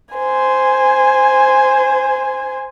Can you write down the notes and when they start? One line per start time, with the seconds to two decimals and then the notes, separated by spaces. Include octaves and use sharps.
0.15 C5 G#5